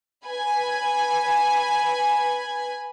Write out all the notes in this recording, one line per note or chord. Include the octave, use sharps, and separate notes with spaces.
B4 G#5 B5